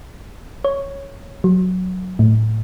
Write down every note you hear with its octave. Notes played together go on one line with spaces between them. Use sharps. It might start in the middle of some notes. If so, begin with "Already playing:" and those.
C#5
F#3
A2